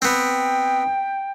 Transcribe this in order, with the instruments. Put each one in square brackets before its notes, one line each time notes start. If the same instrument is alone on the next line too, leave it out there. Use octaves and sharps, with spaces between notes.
[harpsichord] B3 C4 [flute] G5